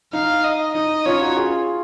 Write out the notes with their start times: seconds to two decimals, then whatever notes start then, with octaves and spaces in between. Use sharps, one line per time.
0.13 D#4 F5
0.44 D#5
0.74 D#4 D#5
1.06 C#4 F4 C#5
1.21 D#4 F#4
1.37 F4 G#4